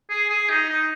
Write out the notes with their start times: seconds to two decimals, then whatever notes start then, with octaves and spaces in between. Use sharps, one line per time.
0.10 G#4
0.30 G#4
0.50 D#4
0.69 D#4